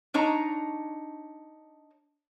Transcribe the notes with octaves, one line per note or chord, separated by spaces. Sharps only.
D4 D#4 C#5 A#5